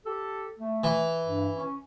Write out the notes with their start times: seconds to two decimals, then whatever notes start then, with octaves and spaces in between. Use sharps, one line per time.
0.06 G4 A4
0.59 A3
0.84 E3
1.25 G2
1.55 C#4